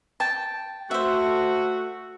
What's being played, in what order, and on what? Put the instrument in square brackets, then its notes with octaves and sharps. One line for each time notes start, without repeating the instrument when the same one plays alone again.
[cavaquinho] G5 A5
[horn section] A3 F#4 [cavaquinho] C5 E5